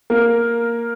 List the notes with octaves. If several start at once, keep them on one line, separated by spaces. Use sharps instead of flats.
A#3 A#4